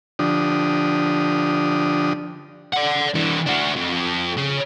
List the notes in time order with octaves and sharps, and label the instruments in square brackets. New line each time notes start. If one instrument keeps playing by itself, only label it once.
[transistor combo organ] D3 F3 D4 G4 D#6
[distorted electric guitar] D5 F#5
E3 D4
D4 F#4
F2
C#3